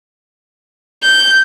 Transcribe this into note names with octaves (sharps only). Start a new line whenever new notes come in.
G6